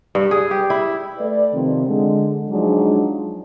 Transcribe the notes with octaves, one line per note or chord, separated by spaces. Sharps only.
G2
G#4
G4
E4
A3 B4 D5
C3 D#3 F3 C4
D3 G#3
F3 F#3 G#3 D4 D#4